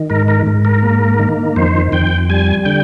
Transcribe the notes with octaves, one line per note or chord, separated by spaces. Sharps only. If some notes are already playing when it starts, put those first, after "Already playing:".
Already playing: D#3
G#2 A#4
A#4
G#2
A#4
A#3
D#3
F2 C5
F2 G5
G3 G#5
D3 G5